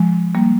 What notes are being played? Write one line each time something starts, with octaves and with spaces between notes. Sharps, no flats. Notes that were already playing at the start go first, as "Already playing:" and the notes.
Already playing: F3 G#3
G3 A#3